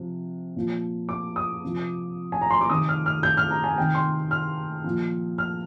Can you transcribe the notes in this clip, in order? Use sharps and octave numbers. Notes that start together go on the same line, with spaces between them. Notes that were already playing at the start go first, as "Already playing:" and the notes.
Already playing: C3 F3
A#2 F3
D6
D#6
C3 F3
G#5
A#5
C6
D6
C3 D#3 D#6
F6
F6
G6
F6
A#5
G#5
C3 D#3 G5
C6
F6
A#2 F3
F6